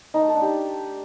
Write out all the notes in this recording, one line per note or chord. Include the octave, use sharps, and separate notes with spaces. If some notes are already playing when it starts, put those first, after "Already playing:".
D#4
A3
A4
D4
G4